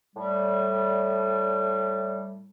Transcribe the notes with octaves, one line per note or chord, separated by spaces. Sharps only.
A2 G3